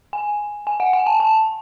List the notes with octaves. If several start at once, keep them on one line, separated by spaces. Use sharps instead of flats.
G#5
G#5
F#5
G#5
A5
A5